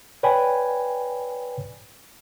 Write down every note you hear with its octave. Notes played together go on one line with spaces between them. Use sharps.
B4 C#5 D5 G5 G#5 B5